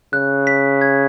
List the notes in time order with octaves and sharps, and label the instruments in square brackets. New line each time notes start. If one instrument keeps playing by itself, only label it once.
[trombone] C#3 [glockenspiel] F#6
[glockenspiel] B6
G#6